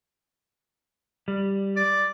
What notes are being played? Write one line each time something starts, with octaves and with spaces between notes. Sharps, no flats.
G3
D5